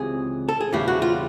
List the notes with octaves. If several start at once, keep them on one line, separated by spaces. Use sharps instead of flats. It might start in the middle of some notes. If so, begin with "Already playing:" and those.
Already playing: C#2 C3 E3 G#4
A4
G#4
E2 C#3 E3 G3 G4
F#4
F4